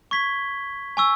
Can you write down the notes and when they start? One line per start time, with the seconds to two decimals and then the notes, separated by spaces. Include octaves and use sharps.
0.11 C#6 G#6 B6 G7
0.97 G#5 C#6 E6